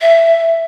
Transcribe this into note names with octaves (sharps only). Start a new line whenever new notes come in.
E5